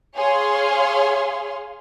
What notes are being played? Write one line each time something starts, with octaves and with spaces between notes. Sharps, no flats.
G#4 C#5 F5 C6